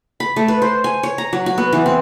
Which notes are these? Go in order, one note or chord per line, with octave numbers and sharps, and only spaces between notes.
B5
A3
B4
C5
G#5
C#5
A#5
F#3
F#4
B3
E3
C4